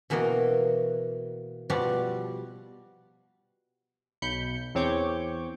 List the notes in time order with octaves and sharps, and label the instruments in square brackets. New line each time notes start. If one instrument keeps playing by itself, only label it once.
[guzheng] B2 E3 A#3 F#4 D#5
B2 F3 G3 F#4 D5
[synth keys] B1 B5 G6 C#7
E2 C4 C#5 C#6 D6 G6